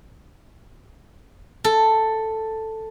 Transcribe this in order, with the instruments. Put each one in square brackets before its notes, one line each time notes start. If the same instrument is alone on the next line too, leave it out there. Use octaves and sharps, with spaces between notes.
[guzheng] A4